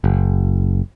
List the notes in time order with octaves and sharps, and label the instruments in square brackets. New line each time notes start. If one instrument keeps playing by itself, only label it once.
[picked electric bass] F#1